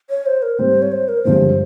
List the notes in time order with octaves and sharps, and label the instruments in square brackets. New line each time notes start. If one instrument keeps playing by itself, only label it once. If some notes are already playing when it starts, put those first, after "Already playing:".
[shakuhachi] C#5
C5
A#4
[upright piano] G#2 G3 C4 [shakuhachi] C5
[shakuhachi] C#5
C5
A#4
[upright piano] G1 G2 F3 G#3 C#4 [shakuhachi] C5